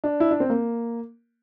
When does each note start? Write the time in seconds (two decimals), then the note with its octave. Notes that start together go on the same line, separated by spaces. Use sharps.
0.04 D4
0.20 E4
0.31 D4
0.40 C4
0.50 A#3